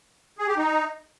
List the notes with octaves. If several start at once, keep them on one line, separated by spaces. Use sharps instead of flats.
G#4
G4
D#4